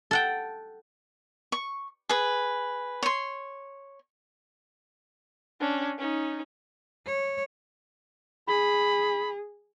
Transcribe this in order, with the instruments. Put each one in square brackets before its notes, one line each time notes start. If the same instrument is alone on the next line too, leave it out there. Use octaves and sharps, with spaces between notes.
[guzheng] A4 F#5 G5
[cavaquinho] C#6
G#4 B4
C#5 C6
[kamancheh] C#4 D4
C#4 D#4
[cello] C#5
[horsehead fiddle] G#4 [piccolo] B5